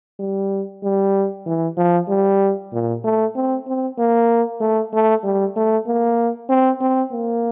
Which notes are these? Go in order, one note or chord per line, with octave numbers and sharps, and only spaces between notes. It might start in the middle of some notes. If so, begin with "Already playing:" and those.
G3
G3
E3
F3
G3
A#2
A3
C4
C4
A#3
A3
A3
G3
A3
A#3
C4
C4
A#3